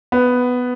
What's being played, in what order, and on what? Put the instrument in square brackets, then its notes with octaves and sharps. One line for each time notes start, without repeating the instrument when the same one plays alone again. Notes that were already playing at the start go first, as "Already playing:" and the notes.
[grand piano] B3